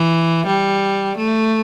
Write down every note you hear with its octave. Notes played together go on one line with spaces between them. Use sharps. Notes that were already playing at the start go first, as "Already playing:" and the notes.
Already playing: E3
G3
A3